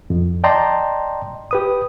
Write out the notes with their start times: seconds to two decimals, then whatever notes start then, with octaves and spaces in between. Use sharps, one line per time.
0.10 F2
0.44 D5 D#5 G5 A5 A#5 C6
1.51 G4 B4 D#6